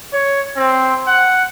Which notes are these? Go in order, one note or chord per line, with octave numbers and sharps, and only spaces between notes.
C#5
C4
F#5